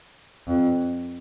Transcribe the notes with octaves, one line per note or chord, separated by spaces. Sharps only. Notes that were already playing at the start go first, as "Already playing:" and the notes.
F2